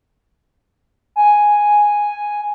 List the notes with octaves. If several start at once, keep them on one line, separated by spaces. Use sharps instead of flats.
G#5